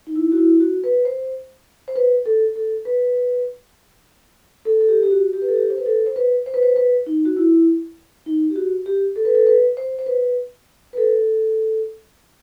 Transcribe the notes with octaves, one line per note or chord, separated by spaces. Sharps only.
D#4
E4
F#4
E4
F#4
B4
C5
C5
B4
A4
A4
B4
A4
A4
G4
G4
F#4
G4
B4
A4
G4
C5
B4
A4
C5
B4
C5
B4
C5
B4
D#4
F#4
E4
D#4
G4
F#4
G4
A4
B4
A4
B4
C5
C5
B4
B4
A4